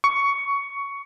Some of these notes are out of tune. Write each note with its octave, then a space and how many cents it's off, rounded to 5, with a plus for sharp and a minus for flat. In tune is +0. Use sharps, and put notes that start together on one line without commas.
C#6 +15